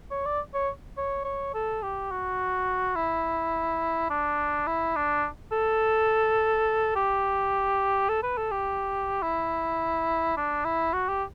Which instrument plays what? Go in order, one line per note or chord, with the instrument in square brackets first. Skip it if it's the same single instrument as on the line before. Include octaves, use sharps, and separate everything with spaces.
[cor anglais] C#5
D5
C#5
C#5
C#5
A4
G4
F#4
E4
D4
E4
D4
A4
G4
A4
B4
A4
G4
E4
D4
E4
F#4
G4